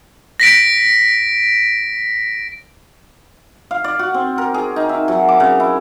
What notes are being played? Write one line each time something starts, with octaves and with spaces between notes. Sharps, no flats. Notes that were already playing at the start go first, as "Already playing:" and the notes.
A#6 B6 D7
F5
D5
F#4
C4
A#4
G#4
D#4
E5
F#3
D6
C#3
E4